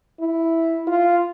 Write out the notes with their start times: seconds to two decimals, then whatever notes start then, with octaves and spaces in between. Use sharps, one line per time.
0.20 E4
0.87 F4